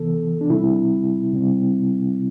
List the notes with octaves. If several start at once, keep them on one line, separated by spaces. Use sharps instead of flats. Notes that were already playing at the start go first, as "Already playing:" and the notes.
Already playing: C3 E3 B3 A4
D4
C3 G3 C4 E4
C3 G3 C4